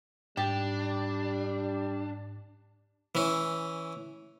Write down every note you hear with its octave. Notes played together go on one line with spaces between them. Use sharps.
G#2 G3 D4 G4 A6
E3 C#4